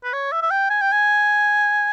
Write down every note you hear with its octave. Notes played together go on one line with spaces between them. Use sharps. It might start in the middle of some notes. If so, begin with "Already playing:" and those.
B4
C#5
E5
E5
G5
G#5
G5
G#5